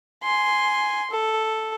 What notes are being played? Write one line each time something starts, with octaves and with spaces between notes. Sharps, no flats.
G#5 C6
A4